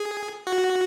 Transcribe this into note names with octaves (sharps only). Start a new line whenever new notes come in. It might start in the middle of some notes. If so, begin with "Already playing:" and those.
Already playing: G#4
F#4